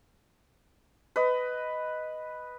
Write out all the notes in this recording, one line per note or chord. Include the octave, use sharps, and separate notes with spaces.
B4 D#5